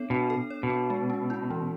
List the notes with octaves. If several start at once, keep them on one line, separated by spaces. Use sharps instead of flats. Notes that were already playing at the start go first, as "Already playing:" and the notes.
Already playing: B3 D4 A4 C#5
B2 D4
A4
C#5
B2
B3
G#3
C#4
E4
E3